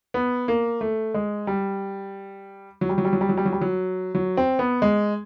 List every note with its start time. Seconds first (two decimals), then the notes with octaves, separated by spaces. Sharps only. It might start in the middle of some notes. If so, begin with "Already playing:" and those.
0.14 B3
0.48 A#3
0.81 A3
1.14 G#3
1.47 G3
2.81 F#3
2.89 G3
2.98 F#3
3.05 G3
3.13 F#3
3.21 G3
3.29 F#3
3.37 G3
3.45 F#3
3.53 G3
3.61 F#3
4.15 F#3
4.37 C4
4.59 B3
4.82 G#3